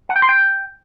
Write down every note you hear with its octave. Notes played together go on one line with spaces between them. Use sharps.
F#5
G5
C6
G5